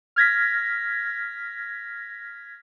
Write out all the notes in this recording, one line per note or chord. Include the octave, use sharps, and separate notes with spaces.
F6 G#6 A#6 B6